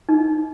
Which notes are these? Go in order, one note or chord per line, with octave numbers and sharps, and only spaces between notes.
D#4